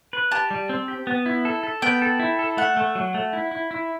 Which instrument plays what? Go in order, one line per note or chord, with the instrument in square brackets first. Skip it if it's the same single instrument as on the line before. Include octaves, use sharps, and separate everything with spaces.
[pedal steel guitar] B4
[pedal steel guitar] G4 [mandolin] A5
[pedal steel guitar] G3
C4
G4
B3
E4
A4
A4
[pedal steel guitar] B3 [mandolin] G5
[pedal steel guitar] A4
E4
A4
[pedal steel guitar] A3 [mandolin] F#5
[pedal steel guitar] A3
F#3
A3
E4
E4
E4